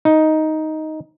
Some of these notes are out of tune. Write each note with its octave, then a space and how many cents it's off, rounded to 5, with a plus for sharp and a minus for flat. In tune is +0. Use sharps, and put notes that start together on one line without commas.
D#4 +5